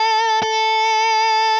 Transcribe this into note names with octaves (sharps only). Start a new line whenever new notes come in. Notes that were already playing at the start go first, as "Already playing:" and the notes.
Already playing: A4
A4